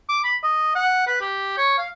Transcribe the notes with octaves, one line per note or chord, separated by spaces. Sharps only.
D6
B5
D#5
F#5
B4
G4
C#5
F5